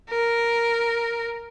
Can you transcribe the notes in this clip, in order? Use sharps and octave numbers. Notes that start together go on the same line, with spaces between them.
A#4